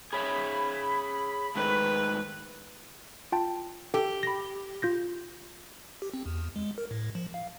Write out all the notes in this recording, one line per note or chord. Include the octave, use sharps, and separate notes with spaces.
G#4 C#5 E5 B5
G#2 D#3 A3 B4
F4 G5 A5
G4 A4
B5 A#6
F4 G6 A#6
G4
C4
E2
G#3
A#4
A2
F3
F5